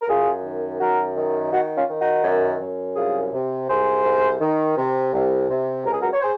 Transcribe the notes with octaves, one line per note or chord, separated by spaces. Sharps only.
A#4
F#2 F4 G#4
D#3
F#2 F#4 A#4
D#3
D#3 D#4 F#4
C#4 F4
D#3
D#4 F#4
F#2
F#2
C2 F4 G#4
C3
C2 G#4 C5
C2
D#3
C3
C2
C3
C#2 A#4
G#4
F#4 A#4
C#5
G#4 C5